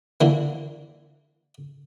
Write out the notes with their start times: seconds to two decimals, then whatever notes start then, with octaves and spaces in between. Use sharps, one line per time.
0.21 D3 E3 A#3